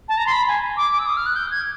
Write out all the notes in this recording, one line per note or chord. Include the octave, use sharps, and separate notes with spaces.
A5
A#5
C6
B5
G#5
D6
E6
D#6
F6
F#6
G6
G#6